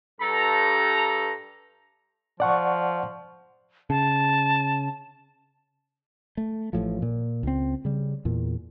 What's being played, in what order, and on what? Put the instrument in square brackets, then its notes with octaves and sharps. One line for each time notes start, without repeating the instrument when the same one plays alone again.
[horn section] G2 A4 A#5
[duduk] F3 [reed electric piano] D5 F#5 C#6
[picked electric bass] C#3 [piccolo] A5
[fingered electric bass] A3
A1 A2 F3
A#2
C#2 C4
C#3 G3
E2 A#2